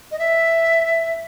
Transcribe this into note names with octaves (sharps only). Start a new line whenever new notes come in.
D#5
E5